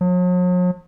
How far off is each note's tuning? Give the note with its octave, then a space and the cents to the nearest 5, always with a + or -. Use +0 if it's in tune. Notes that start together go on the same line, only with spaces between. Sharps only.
F#3 -45